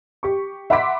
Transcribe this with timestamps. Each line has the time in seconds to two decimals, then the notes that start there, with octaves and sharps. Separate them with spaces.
0.23 G4 C#6
0.70 E5 F#5 B5 C6 D6 B6